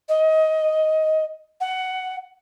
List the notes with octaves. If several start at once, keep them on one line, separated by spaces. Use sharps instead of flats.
D#5
F#5